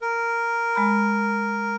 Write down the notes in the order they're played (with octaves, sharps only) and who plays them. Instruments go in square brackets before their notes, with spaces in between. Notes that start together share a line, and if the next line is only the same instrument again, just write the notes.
[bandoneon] A#4
[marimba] G#3 B5